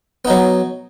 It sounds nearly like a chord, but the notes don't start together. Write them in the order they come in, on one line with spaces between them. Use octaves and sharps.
B3 D#4 F#3